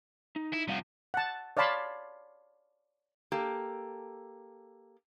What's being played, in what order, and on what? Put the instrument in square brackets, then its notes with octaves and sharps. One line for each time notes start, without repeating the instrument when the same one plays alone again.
[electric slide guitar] D#4
[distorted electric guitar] E4
[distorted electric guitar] C3 F3 [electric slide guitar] G3 F5 F#5
[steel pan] F#5 A5
C#5 D5 F5 A5 B5 C6
[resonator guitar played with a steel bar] A#3 G4 A4